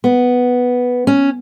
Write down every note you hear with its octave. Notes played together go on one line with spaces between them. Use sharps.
B3
C#4